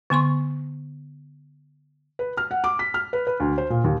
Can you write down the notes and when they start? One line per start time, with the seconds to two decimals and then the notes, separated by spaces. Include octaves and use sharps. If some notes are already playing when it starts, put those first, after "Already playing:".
0.10 D3 B3 C6 C#6
2.19 B4
2.37 F6
2.51 F#5
2.64 D6
2.79 B6
2.94 F6
3.13 B4
3.27 B4
3.40 D2
3.58 C5
3.70 A#2
3.84 D#2